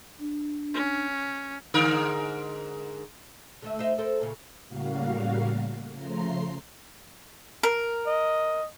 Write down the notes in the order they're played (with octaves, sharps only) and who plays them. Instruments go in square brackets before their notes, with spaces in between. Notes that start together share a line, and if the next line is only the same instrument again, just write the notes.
[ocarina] D4
[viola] C#4
[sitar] G#2 D3 A#4
[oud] D3 A3 E5
D#4 C5 E5
A4 A#4 C5
A#2 C#3
[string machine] A2 C#3 G3 A#3 F#4 F5
C#3 F3 A3 A#5 C6 C7
[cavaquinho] A#4
[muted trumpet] D#5